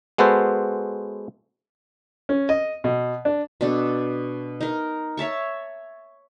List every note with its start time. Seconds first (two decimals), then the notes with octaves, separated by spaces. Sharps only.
0.18 G#3 B3 F#4 A4 B4 C5
2.29 C#4
2.49 D#5
2.84 B2
3.25 D4
3.61 B2 D4 A4
4.61 D#4 A#4
5.17 C#5 E5 A5 C#6